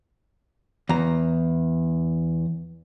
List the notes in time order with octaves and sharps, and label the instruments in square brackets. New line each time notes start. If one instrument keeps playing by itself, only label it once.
[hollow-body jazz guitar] E2 A#5